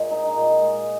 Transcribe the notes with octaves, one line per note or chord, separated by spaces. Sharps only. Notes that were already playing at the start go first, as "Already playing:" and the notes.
Already playing: A#2 G#3
D#4
A#2
G#3